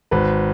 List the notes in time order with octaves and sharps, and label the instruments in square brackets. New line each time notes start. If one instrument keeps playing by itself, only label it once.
[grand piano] G#1 B4